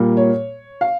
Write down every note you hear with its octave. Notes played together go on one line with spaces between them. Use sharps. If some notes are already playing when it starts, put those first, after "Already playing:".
Already playing: A#2 G3 A#3
C#5
F5